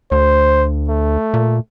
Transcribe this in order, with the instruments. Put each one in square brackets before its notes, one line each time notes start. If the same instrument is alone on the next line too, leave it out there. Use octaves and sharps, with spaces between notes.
[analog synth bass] D2 [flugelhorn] C5
[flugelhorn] A3
[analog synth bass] A#2